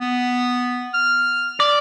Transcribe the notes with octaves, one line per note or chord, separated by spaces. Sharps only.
B3
F6
D5